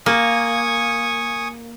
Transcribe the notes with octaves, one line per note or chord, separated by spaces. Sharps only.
A#3 G#5 C#6 D#6